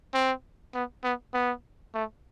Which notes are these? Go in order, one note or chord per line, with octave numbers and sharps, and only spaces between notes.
C4
B3
B3
B3
A3